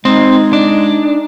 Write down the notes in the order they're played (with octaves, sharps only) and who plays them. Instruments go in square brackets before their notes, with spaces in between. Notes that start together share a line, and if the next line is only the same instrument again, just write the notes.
[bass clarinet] G#3 [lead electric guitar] C4 [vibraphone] D#4 D#5 A#5
[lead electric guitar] D4